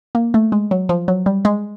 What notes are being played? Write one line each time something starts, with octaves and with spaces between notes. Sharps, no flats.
A#3
A3
G#3
F#3
F3
F#3
G3
G#3